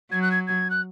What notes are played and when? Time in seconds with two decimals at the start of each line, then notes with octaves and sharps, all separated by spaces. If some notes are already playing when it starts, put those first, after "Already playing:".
0.11 F#3 G#6
0.22 F#6
0.31 G#6
0.47 G#6
0.70 F#6